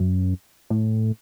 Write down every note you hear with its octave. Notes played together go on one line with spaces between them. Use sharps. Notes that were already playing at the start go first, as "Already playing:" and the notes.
Already playing: F#2
A2